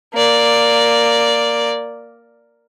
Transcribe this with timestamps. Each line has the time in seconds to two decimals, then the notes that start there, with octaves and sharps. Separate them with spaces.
0.14 A#3 D5